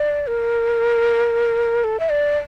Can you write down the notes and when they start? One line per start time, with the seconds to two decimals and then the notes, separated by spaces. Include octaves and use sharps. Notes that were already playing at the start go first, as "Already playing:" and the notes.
Already playing: D5
0.27 A#4
1.84 A4
2.00 E5
2.09 D5